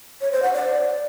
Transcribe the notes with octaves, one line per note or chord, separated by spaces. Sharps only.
C#5
C5
F#5
D5